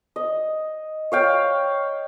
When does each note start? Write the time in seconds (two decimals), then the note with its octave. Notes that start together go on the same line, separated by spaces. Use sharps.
0.16 D#5
1.12 C#5 F5 G5